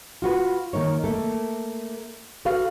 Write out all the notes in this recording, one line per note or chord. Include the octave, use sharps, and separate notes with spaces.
F4 F#4 B4
D#3 A#3 D#4 C#5
A3 A#3 A4
F#4 A4 B4 F5